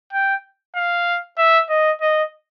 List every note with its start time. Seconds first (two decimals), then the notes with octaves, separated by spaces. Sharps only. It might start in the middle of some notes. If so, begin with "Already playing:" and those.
0.13 G5
0.76 F5
1.38 E5
1.69 D#5
2.01 D#5